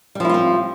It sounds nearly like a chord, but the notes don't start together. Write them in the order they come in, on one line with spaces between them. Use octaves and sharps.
G3 F3 E4 F4 C4